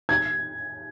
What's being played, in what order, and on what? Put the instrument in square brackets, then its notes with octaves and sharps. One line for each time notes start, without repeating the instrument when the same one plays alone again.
[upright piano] G#6